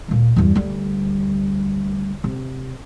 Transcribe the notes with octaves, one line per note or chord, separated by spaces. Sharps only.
D2 A#2
E2 G2
D2 G3
C3